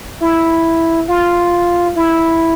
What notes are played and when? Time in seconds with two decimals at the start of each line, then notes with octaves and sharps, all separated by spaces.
0.21 E4
1.08 F4
1.96 E4